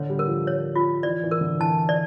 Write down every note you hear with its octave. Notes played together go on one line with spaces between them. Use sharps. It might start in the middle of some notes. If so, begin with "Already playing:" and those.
Already playing: D3 C#5
G3
A#4
F3
C#5
F4
E3 D5
E3
A#4
D3
E3 A5
D5